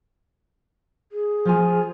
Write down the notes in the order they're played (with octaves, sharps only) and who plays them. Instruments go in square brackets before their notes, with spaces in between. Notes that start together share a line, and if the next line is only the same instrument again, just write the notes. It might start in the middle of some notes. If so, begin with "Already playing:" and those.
[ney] G#4
[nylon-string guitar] F3 F4 G#5